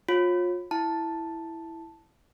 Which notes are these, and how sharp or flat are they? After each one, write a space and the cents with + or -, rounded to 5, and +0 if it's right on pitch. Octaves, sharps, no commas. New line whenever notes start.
F4 +30 C#5 -35
E4 +0 A5 +0